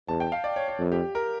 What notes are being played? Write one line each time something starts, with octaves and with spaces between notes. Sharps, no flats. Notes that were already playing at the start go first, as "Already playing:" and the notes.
E2 A5
G5
F5
D5
C#5
C#5
F2
G4
A#4